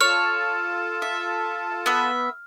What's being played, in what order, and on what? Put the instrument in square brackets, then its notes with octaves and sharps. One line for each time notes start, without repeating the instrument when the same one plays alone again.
[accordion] F4 A4 A5 [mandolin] C#5 [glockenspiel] F6
[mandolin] E5
B3 E5